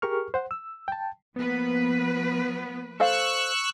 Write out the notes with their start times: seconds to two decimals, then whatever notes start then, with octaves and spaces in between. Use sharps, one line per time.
0.02 G4 G#4 A#4 C#6 F6
0.34 C5 F#5
0.51 E6
0.88 G5 A5
1.36 F3 A#3 B3 B4
3.00 A4 C5 F5 C#6 E6 F#6